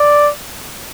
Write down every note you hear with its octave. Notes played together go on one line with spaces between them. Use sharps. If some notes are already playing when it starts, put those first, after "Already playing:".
Already playing: D5